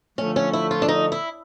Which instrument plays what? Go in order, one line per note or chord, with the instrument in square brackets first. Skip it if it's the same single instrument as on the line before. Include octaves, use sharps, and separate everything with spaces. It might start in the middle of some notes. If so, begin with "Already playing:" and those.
[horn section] D3 F3 A3 [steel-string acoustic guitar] C#4
[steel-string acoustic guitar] C#4
E4
F4
D4
D#4
E4